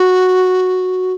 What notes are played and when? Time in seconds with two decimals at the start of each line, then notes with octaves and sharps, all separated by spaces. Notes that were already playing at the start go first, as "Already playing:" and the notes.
Already playing: F#4